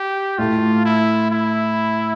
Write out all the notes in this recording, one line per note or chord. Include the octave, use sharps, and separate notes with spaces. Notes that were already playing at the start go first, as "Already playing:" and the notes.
Already playing: G4
A2 A3 F4
E4
E4